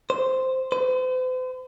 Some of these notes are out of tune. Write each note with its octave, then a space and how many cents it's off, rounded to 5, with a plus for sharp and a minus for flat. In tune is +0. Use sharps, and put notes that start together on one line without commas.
C5 -5
C5 -45